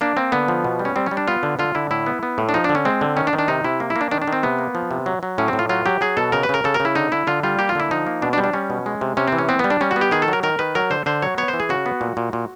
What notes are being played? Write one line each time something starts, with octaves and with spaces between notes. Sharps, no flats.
A#3 D4
A#3 C4
D3 B3
F3
B2
G3
C#4
G3 C4
G3 C#4
D4
B3 F4
D3
D3 F4
D3 E4
A2 E4
B3
B3
A2
D4
F3 D#4
D3 D4
C#4
G#3 C4
D3
D#3 C#4
D4
D#3
D4
C3 D#4
C3 E4
A#3
E4
A#3
D4
D#3 D4
D4
D#3
C4
C3 B3
A#3
F3
C3
F#3
F#3
A2 C#4
C4
A2
F4
F#3 F4
F#3 G4
F#3 G#4
B2 A4
C#3 A#4
B4
C#3 A#4
C#3 A4
A#4
C#3
E4
D3 D#4
D3 E4
D3 F4
G3 F4
A#3 G4
F4
D3 E4
F3 D#4
A#3
B2 D4
D4
G3
D4
G3 C#4
B2
G#3
C3
C3 C#4
E3 C4
C#4
B3 C4
G3 B3
D4
G3 C#4
F#4
B3
G4
D#3 G#4
A4
F#3 A#4
D#3 A#4
D#3 B4
F#3 A#4
D3 C5
D3 C5
F#3 C#5
B3 C#5
C5
E3
G#4
C#3 F#4
B3
A#2
A#2
A#2